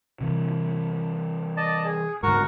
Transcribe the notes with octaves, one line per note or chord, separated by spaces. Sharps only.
C3 E3
D5 D#5 A5
G#4
G#2 D3 F#4 A#4 C#6